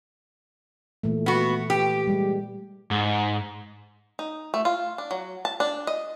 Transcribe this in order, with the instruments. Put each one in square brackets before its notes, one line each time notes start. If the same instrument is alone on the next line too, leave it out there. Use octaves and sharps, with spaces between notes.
[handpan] A#2 E3 A3
[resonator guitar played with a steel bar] B3 F#4
[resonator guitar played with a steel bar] G4 [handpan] B4
[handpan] G3 G#3
[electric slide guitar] G#2
[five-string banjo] D#4
A3
F4
D4
F#3
A5
D4
D#5